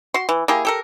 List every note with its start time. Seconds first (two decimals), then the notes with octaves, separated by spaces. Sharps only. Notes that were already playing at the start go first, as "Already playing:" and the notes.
0.14 F#4 C6
0.29 E3
0.48 A#3 E4 G4 G#4
0.65 G4 A4 A#4